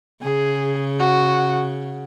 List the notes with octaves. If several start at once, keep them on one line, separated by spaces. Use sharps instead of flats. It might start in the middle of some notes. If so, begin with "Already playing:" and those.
C#3 G#4
F#4